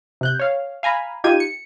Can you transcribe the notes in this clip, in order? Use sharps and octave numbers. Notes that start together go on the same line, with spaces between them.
C3 F#6 G6
C#5 F5
F5 G#5 A#5 B5
D#4 F4 G4 G5 G#6 D#7
C#7